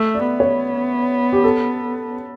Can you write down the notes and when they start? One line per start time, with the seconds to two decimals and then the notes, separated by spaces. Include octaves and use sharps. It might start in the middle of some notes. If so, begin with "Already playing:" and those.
Already playing: A3 E5
0.15 D5
0.27 B3
0.40 C#5
1.32 G4
1.44 A4